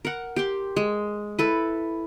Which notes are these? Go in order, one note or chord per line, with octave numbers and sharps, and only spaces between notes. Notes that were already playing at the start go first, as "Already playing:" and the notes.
A#4 F#5
G4 G5 C6
G#3
E4 A4 B4